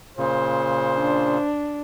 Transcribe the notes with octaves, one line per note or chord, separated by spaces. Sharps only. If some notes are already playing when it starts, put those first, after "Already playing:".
A#2 C#3 C5
D4